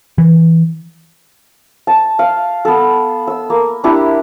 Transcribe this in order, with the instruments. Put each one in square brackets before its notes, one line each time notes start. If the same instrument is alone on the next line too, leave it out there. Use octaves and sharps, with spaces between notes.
[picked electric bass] E3
[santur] A5
F5
B3 A4
E6
A#3
D4 E4 G4